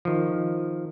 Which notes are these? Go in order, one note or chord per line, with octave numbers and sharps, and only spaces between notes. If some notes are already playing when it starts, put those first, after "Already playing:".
D#3 F3